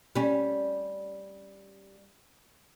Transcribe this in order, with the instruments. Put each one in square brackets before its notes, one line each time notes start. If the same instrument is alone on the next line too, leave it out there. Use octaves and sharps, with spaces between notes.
[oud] G3 C#4